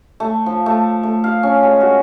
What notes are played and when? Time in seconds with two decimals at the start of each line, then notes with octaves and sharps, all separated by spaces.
0.20 A3
0.46 F3
0.66 A3
1.03 A3
1.24 F5
1.43 C#4
1.63 G#3
1.81 F#4